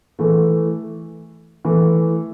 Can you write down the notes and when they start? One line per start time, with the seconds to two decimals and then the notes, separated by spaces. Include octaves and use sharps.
0.19 E3 A3
1.65 E3 A3